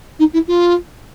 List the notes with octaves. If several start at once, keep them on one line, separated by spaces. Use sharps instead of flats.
D#4
E4
F4